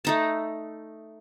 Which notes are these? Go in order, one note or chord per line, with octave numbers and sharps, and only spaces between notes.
A3 D#4 A5